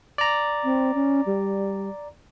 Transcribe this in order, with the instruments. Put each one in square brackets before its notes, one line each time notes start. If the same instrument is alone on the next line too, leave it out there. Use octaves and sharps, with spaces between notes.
[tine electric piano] D5 A#5
[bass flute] C4
C#4
G3